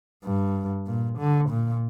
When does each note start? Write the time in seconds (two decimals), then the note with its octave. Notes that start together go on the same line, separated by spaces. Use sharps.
0.24 G2
0.87 A#2
1.18 D3
1.50 A#2